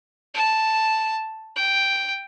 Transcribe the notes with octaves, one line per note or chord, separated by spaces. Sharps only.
A5
G5